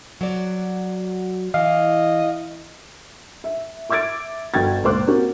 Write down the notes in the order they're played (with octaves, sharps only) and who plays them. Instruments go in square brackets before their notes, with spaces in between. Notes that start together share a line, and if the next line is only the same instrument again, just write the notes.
[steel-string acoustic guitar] F#3 F#4 D5
[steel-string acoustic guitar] E3 [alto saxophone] D#5 [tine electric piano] F5
[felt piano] E5
E5 D6 E6 G#6 A6 D7
G1 F#4 G5 G#6 A6
C#2 A#2 C5 D6 F#6
A#3 C4 C#4 F#4 G4 A#4